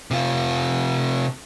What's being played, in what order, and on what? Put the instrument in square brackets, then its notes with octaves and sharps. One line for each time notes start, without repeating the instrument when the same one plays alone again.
[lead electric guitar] C3 F4